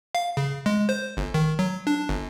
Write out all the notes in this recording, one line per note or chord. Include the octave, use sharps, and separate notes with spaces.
F5
C#3
G#3
C5
G1
D#3
F#3
D4
G1